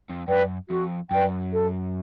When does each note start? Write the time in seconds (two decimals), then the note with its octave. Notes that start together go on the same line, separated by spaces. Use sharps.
0.09 F2
0.28 F#2 B4 D5 G5
0.70 F2 F#4
1.11 F#2 B4 D5 G5
1.52 A4